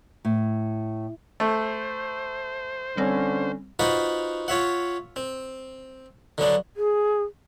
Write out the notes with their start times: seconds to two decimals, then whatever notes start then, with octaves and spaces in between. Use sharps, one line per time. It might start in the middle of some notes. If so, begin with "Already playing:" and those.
0.25 A2
1.40 A3 C5
2.97 D3 G3 C4 C#4
3.79 D#4 F4 F#4 B4 C5 F#5
4.48 F4 C#5 E5 F#5
5.16 C4
6.38 D3 F#3 B3 D4
6.76 G#4